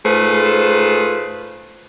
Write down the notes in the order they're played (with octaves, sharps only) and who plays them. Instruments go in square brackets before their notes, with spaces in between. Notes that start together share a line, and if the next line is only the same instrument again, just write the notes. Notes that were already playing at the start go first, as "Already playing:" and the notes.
[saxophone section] G#2 A3 F4 G#4 B4 C5